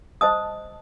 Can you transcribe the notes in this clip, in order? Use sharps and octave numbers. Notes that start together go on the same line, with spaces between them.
C5 D#5 A5 D#6